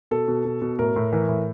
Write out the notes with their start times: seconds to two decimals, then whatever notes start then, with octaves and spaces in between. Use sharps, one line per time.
0.11 B2 A4
0.28 B2
0.45 B2
0.62 B2
0.79 A2 A#4
0.96 A2
1.13 E3 A#4
1.29 A2